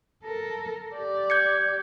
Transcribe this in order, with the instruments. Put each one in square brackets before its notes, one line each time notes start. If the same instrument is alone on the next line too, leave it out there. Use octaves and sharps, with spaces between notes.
[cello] A4 A#4
G4 D5
[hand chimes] G6 G#6 C#7